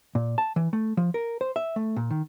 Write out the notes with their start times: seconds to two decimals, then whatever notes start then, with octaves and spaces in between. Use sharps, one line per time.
0.15 A#2
0.38 A5
0.56 E3
0.73 A3
0.97 F3
1.14 A#4
1.41 C5
1.56 E5
1.76 A3
1.96 A#2
2.11 D#3